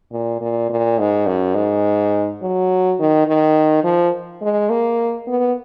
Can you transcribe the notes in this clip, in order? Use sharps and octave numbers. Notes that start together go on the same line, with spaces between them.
A#2
A#2
A#2
G#2
F#2
G#2
F#3
D#3
D#3
F3
G#3
A#3
B3